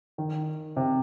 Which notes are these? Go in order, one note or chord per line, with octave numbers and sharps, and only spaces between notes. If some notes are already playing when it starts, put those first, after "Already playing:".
D#3
C3